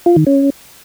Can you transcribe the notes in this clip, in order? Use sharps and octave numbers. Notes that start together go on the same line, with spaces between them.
F4
D#3
C#4